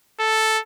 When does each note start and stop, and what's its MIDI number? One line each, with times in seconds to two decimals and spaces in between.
0.19 0.59 69